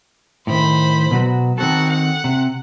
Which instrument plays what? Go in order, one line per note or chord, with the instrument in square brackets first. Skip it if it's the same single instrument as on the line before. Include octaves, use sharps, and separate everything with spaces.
[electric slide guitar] A2 C3 D#3 [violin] C5 B5
[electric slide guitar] B2 F#3 F#4
[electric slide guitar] D#3 C4 A4 [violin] F#4 F#5
[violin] F#5
[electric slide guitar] C3